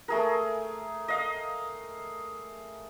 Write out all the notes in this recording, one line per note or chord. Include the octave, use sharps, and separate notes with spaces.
A3 G#4 A#4
D#5 F5